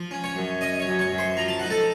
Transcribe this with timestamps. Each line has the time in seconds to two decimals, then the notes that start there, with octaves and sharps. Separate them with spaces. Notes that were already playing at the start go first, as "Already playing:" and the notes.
Already playing: F3
0.11 C#4
0.24 C#5 C#6
0.36 F#2
0.61 C#4 D#5 D#6
0.80 C#5 C#6
0.87 F#2
0.99 C#5 C#6
1.12 F#2
1.18 C5 C6
1.37 F3 A#5
1.48 A5
1.59 D#4 F#5
1.70 A4 A5